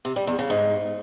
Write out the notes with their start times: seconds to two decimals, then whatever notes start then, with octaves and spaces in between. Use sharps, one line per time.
0.05 C3
0.16 G3
0.27 E2
0.39 C#3
0.50 G#2